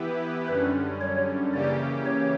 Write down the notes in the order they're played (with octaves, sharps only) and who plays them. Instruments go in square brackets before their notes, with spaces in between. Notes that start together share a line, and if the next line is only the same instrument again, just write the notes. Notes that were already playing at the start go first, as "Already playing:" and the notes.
Already playing: [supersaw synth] E3 B3 E4 G4 B4
[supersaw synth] F#2 D3 G3 C#4 [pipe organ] B4
[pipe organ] C#5
[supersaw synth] C#3 E3 A#3 C#4 G4 [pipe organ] D5
[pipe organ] C#5